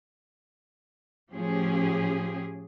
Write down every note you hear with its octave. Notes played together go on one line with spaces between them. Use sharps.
A2 F3 C#4 G4 G#4